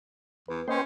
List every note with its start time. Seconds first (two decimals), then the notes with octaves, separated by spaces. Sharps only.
0.48 E2 B4
0.68 A#3 C#4 B4 C5 D#5 G5 C6